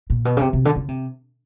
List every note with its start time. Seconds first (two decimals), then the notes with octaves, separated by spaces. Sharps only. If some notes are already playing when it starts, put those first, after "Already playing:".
0.10 A#2
0.25 B2
0.37 C#3
0.41 C3
0.53 C3
0.65 D3
0.76 C#3
0.88 C3